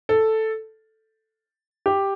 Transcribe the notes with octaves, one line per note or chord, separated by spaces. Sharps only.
A4
G4